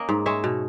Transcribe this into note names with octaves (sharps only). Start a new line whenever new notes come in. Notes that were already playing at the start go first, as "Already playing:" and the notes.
Already playing: A#3 C#4 D#5
G#2
G#3 C#5 E5
B2